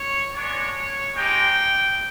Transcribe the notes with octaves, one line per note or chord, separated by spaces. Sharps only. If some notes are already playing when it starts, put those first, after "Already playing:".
Already playing: C#5
G#3 B3 D4 C#5
G#3 C4 D#4 G4 G5